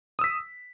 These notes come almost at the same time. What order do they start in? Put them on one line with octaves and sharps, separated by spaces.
D#6 E6 B6